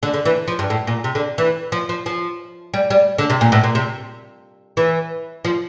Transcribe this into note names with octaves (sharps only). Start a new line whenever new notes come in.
D3
D3
E3
F3
G2
A2
A#2
C3
D3
E3
F3
F3
F3
G3
G3
D3
C3
A#2
A2
A#2
C3
E3
F3